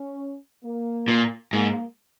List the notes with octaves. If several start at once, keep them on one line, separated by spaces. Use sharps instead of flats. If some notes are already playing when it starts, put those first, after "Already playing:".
Already playing: C#4
A#3
A#2
G#2 A#3